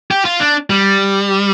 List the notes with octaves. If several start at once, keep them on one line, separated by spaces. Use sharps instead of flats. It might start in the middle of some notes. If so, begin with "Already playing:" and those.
G4
F4
D4
G3